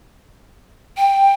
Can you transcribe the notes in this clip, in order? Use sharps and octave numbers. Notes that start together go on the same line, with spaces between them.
G5